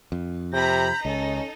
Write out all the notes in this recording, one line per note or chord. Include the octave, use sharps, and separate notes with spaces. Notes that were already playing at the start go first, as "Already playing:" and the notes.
F2
C3 A#5 B5 G6 A#6
C#2 C#4 D#4 A4 D#5